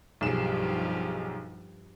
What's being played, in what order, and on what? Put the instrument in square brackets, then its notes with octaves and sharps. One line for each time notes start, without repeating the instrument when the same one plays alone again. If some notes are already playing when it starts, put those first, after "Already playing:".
[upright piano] B1 G#4 E7 [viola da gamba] G2 F3 G4